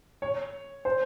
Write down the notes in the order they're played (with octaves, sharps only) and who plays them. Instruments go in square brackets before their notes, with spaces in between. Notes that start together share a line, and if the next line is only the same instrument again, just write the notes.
[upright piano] C#5
C5